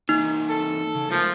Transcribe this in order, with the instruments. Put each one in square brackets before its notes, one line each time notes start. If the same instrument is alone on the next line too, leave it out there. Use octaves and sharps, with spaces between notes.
[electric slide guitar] E3 A#3 [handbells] D#4
[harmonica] A4
[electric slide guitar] C#3
[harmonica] F3 [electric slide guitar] G#3 A3 A#4